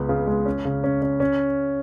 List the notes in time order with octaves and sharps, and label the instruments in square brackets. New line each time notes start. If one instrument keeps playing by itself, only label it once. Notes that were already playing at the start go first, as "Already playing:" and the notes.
Already playing: [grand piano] C#2 B3
C#3
G#3
C#4
C#3
C#4
C#4
C#4